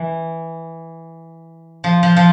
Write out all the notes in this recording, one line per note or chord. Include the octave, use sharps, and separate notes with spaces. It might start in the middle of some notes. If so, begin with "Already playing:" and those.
Already playing: E3
F3
F3
F3